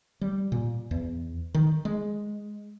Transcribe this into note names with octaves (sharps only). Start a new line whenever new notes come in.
G3
A#2
E2
D#3
G#3